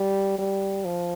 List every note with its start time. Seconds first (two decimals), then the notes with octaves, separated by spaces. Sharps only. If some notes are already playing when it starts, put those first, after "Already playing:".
Already playing: G3
0.38 G3
0.85 F3